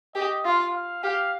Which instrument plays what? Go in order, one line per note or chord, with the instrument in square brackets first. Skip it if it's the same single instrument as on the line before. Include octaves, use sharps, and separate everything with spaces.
[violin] G4 [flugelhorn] D#5
[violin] F4 [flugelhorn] F5
[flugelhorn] F5
[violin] G4 [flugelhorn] F5